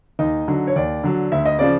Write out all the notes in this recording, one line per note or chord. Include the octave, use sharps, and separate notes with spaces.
D#2 D#4 D#5
D3 F#3
C#5
D#2 D5
D3 F#3
D2 E5
D#5
C#3 F3 D5